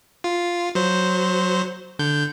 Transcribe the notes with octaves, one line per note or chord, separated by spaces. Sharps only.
F4
F#3 C5
D3 G6